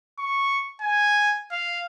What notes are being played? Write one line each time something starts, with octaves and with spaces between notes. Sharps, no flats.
C#6
G#5
F5